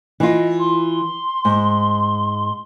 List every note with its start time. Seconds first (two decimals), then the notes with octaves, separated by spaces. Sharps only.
0.20 E3 F4 D#5
0.58 C6
1.45 G#2